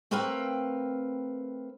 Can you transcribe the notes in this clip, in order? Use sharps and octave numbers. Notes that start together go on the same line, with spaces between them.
A3 C4 A#4 B4 F5 G5